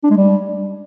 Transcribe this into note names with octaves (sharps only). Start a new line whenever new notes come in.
D4
G#3
G3